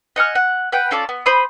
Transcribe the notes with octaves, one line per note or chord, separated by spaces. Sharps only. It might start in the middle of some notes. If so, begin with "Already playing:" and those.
D#5 F#5 G#5 F6
F#5
B4 F#5 G5
C#4 F4 A4 D5
B3
C5 B5 D#6